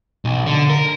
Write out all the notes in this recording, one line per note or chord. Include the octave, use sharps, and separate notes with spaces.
B1
D3
A#4